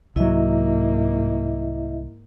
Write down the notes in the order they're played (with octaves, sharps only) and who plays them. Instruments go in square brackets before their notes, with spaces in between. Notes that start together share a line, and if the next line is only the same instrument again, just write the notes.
[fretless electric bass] C2 F#3 [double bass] G#2 A#3 [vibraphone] E4 D#5 E5